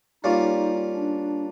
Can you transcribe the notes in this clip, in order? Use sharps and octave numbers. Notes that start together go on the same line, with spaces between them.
G3 A#3 C#4 D#4 F4
D4